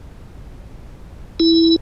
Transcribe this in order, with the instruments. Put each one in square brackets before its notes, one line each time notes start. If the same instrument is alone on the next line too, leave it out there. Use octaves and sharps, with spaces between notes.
[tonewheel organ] E4